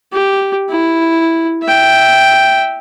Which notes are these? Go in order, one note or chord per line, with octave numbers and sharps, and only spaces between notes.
G4
E4
E5 G5